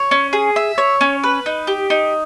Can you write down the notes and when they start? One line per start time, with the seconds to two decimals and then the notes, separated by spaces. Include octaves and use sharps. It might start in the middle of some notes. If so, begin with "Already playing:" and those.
Already playing: C#5
0.11 C#4
0.33 G#4
0.56 E5
0.78 C#5
1.01 C#4
1.24 B4
1.46 D#4
1.67 G4
1.90 D#4